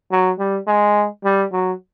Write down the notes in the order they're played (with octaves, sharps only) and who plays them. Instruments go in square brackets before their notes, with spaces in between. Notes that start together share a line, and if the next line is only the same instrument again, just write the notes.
[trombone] F#3
G3
G#3
G3
F#3